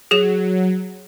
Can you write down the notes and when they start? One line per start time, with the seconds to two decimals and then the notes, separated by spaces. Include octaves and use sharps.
0.11 F#3 G#4 E7